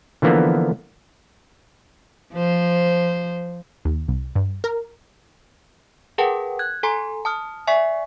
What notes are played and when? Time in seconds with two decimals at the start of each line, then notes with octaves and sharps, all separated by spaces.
0.22 D3 E3 F3 A#3 B3
2.33 F3 C5
3.85 D#2
4.08 C2
4.36 G2
4.64 A#4
6.18 G#4 A#4 B4 F#5 G5 A5
6.59 F#6 G#6
6.83 A4 G#5 A#5 C6
7.25 A5 D#6 F6
7.67 D5 E5 G#5 C#6 B6